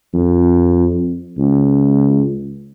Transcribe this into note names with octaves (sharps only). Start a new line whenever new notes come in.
F2
C#2